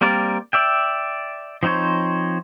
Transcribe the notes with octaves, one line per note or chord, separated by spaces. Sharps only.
G3 A#3 C4 A#4 D5
D5 E5 G5
F3 C4 D#4 C5 C#5